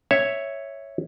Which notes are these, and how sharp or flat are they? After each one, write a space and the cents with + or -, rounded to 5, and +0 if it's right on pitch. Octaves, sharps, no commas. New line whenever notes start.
C#5 +0 E5 +0